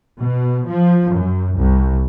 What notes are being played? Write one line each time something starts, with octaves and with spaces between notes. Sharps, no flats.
B2
F3
F#2
C2